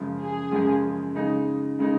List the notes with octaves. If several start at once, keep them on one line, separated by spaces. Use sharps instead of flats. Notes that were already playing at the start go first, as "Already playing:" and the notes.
Already playing: F#2 C#3 F3 G#3
G#4
F#2 C#3 F3 G#3
C#3 G#3 D#4
C#3 G#3 D#4